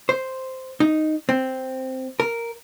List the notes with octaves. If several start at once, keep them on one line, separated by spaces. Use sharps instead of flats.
C5
D#4
C4
A#4